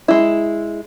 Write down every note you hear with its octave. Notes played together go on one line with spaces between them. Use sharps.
G#3 E4